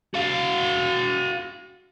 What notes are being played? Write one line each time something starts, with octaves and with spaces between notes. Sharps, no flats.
F#4 F5